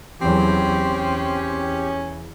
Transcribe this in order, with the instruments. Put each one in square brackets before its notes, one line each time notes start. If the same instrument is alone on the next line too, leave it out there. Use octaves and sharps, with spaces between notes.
[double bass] E2 F#3 [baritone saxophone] C4 [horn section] C#4 [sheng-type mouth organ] G4
[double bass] E2